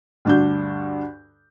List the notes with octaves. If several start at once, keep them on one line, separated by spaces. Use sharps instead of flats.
D2 G2 D4 F#4 G6